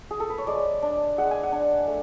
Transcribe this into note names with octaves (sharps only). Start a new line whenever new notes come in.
G#4
A4
B4
C#5
G#3 D5
D4
G#3 F#5
G#5
F#5
D4
A3